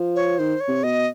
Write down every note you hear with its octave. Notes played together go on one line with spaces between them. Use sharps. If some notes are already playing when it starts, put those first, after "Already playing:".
Already playing: F3
C#5
D#3 C5
C#5
C3
B2 D#5